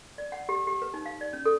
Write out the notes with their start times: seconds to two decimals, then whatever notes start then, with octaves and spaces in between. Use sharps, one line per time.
0.18 D5
0.32 F#5
0.49 G4
0.67 G4
0.82 B4
0.94 D#4
1.06 F5
1.21 D5
1.33 C#4
1.46 A4